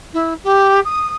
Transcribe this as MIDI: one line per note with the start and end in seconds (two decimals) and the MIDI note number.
0.13 0.33 64
0.43 0.79 67
0.84 1.16 87